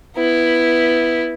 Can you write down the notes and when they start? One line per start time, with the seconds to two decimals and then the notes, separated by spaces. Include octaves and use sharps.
0.16 B3 E4